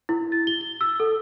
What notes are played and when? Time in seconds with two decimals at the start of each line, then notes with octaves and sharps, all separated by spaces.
0.09 E4
0.32 A6
0.47 G7
0.61 G7
0.81 E6
1.00 A4